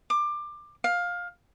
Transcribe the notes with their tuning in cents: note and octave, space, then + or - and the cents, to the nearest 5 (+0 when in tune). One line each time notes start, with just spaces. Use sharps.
D6 +20
F5 +15